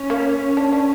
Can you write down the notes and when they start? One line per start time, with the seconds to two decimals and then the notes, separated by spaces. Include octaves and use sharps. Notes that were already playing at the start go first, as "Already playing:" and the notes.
Already playing: C#4
0.10 A#3
0.57 D4
0.72 D4